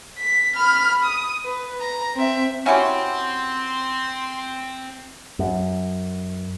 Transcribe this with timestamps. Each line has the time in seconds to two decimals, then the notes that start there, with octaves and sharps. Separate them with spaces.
0.18 B6
0.56 B5 F6
1.04 D#6
1.44 B4
1.80 A#5
2.15 C4 E5
2.66 C4 C#4 E4 F#4 G4 C#5 F#5 C6
5.39 F#2